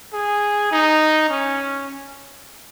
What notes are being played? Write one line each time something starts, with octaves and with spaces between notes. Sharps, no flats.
G#4
D#4
C#4